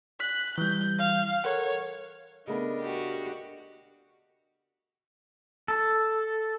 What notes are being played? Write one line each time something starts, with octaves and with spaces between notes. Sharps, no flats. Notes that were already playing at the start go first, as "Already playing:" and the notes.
F#6 B6
E3 G3 G6
F5
A4 A#4 C#5 F#5
C#3 A3 B3 D4 A#4 D#5
F#4 G4
A4